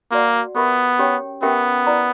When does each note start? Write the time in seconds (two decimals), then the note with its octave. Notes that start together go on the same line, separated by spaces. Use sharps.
0.12 A#3 F#4 B4 D5 F#5
0.55 B3 G4 A#4 E5 B5
0.99 C#4 G4 C#5 G5
1.42 B3 C#4 G4 A#4 E5 G5
1.87 E4 B4 D5 A#5